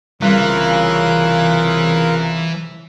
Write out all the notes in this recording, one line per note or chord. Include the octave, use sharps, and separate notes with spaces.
C2 C#3 E3 G3 F4 A#4 F#6